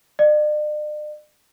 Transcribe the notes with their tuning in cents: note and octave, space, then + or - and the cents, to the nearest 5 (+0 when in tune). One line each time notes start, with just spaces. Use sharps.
D5 +45